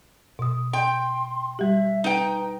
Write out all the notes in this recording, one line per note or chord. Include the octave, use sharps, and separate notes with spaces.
B2 D#6
G5 C6
G3 G4 E5
D#4 B4 G5